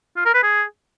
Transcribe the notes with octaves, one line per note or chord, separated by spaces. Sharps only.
F4
A#4
B4
G#4